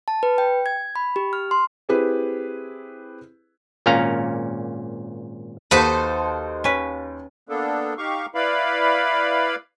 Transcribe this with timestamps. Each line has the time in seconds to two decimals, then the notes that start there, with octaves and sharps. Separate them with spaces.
0.08 A5
0.23 B4
0.38 G5
0.66 G#6
0.96 B5
1.16 G4
1.33 F6
1.51 C6
1.89 C4 E4 G4 G#4 B4
3.86 G#1 A#2 C#4 F5 A#5
5.71 D#2 D#4 F#4 A4 B4 C5
6.64 C#4 B4
7.49 A#3 B3 D4 A4
7.98 D#4 G4 F5 C#6
8.35 E4 B4 D5 F5 B5